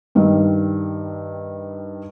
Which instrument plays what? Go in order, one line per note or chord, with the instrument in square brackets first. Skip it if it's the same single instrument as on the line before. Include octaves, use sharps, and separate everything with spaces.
[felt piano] G2 D#3 G3